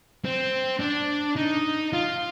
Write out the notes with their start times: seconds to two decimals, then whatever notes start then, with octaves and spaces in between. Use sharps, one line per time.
0.25 C4
0.81 D4
1.37 D#4
1.93 F4